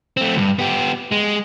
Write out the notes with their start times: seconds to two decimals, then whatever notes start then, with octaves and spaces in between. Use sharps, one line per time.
0.17 A3 C4
0.36 D2 G2
0.59 B3 G4
1.12 G#3